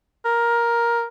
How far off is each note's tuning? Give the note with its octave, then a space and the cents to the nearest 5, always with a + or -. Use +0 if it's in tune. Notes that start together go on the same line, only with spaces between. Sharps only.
A#4 +10